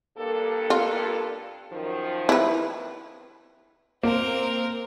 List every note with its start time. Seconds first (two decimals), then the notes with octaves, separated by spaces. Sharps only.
0.17 G2 A#3 A4
0.70 F4
1.71 F#2 D#3 F3
2.29 E4 B4
4.03 A#3 C4 A#4